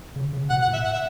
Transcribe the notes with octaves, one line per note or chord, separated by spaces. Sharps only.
C#3
C#3
B2 F#5
F#5
A2
E5
F#5
E5